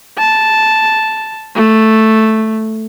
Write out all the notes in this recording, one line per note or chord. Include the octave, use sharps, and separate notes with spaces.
A5
A3